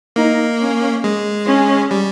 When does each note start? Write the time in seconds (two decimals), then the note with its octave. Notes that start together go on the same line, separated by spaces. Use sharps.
0.16 A#3 D#4
0.60 C#4
1.04 G#3
1.47 C#4
1.91 G3